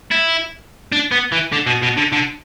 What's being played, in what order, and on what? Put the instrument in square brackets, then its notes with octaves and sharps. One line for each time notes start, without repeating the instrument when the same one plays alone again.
[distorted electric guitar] E4
D4
B3
E3
D3
B2
B2
D3
D3